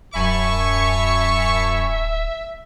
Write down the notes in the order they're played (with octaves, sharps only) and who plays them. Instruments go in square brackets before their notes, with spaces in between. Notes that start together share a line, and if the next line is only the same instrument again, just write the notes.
[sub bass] D1 [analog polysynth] F#2 G#5 B5 [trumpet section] C#5 A5 C#6 [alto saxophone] E5